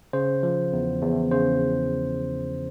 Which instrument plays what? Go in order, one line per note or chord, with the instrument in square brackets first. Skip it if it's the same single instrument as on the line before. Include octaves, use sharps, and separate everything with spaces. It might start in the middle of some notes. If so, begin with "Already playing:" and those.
[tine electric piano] C#3 C5
F3
E2
E2
C#3 C5